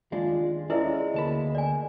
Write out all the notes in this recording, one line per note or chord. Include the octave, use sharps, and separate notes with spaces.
D#2 G#3 D4 F4
G#3 C#4 E4 A4 B4 D5 E5
D2 A#3 A5 B5
D5 G#5